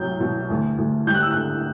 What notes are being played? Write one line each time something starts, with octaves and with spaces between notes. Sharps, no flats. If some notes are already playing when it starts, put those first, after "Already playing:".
Already playing: C2 F#3 G6
B2
D2
D2
G3 G6
F#6
E6
F#6
D3